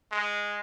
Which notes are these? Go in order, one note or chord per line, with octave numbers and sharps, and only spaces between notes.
G#3